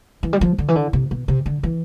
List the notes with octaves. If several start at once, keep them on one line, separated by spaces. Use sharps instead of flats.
E3
G3
F3
D3
E3
D3
C3
B2
C3
D3
E3